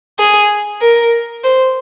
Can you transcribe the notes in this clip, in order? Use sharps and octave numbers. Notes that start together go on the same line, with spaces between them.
G#4
A#4
C5